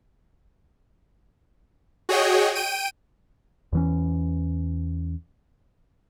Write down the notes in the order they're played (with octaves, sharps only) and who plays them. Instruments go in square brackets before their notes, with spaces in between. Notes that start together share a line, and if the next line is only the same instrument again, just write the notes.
[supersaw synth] F#4 G#4 C#5 D#5 G5
G5 D7 D#7
[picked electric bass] E2 E3 C#4